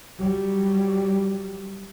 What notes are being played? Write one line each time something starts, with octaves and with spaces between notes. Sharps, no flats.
F#3 G3